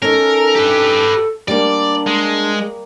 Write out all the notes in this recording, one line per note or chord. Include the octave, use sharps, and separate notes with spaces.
C#4 D#4 A4 A#4
G4 B4
G3 A#3 D4 D5
G#3